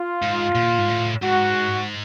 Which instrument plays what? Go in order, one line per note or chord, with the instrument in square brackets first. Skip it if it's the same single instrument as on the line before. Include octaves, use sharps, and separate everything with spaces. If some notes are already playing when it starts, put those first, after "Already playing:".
Already playing: [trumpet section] F4
[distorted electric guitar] G#2
A#2
G#2
A2
[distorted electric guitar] G#2 [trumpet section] F#4